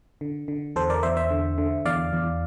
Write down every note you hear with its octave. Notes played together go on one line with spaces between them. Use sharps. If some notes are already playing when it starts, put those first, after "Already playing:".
D3
D3
E2 A4 C5
A#4 D5
E2 C5 E5
C5 E5
D3
D3
E2 D5 F5
E2